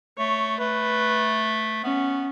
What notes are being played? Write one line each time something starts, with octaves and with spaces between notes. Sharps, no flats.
A3 C#5
A3 B4
B3 C#4